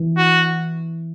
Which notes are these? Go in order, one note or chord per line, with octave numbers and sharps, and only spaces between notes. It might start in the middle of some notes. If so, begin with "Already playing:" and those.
Already playing: E3
F#4